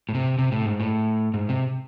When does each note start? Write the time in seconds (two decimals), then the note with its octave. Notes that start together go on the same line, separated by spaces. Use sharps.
0.09 A2
0.15 C3
0.39 C3
0.52 A2
0.66 G#2
0.80 A2
1.34 G#2
1.49 C3